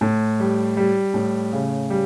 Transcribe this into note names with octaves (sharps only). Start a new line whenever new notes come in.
A2
G3
G3
A2
C#3
G3